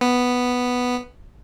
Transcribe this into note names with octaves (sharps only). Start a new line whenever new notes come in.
B3